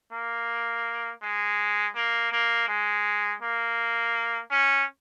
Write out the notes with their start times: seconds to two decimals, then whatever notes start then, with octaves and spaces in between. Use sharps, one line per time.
0.13 A#3
1.23 G#3
1.95 A#3
2.32 A#3
2.69 G#3
3.42 A#3
4.51 C#4